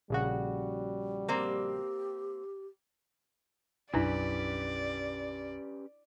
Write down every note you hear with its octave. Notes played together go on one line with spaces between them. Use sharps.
A#1 C#3 G3 F#4
A#3 C4 G4
B1 F#2 C#4 D4 E4 G4 B4 D5